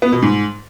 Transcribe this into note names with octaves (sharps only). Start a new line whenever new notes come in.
B3
B2
G#2